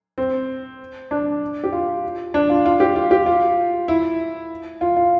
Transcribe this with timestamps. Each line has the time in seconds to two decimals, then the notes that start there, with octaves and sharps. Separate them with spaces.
0.18 C4
1.11 D4
1.64 G4
1.72 F4
2.34 D4
2.50 F4
2.66 F4
2.80 G4
2.96 F4
3.11 G4
3.26 F4
3.88 E4
4.81 F4
4.97 F4